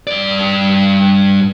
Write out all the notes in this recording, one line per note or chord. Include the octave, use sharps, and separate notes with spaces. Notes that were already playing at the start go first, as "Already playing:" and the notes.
G2 D5